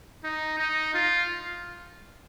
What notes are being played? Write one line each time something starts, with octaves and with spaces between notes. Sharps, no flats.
D#4
D#4
F4